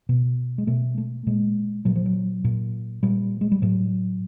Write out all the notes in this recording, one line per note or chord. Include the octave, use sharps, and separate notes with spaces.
B2
G#3
B2 A3
A3
A#2 G#3
A#2 F#3
F3
F#3
A#2
A#2 G3
G#3
G3
A2 F#3